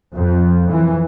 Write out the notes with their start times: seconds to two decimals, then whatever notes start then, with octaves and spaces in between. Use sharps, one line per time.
0.13 F2
0.70 E3